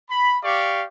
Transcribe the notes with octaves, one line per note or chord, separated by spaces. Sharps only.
B5
G4 D5 F5 C#6